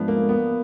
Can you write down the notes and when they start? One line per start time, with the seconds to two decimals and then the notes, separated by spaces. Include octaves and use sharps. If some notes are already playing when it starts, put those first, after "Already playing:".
Already playing: G#2 F3 A3 B3 D4
0.08 A#3
0.29 B3